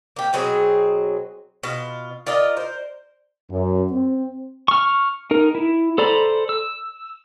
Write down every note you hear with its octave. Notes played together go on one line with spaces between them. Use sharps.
A#3 G4
B2 F#3 C4 G#4
B2 F4
F4 A#4 D5 D#5
A#4 C5
F#2
C4
C#6 F6
D#4 A#4
E4
A4 C5 D5 A#5 B5
E6